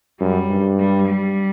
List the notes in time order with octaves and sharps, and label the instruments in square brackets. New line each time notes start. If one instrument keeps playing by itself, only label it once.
[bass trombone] F#2 [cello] G3
[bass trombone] G2
[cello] G3
G3